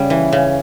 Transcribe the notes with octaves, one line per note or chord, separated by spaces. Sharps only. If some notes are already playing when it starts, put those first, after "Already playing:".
Already playing: C#3 G3
E3
C#3